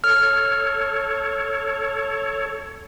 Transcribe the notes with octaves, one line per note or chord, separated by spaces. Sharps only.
A4 C#5 F6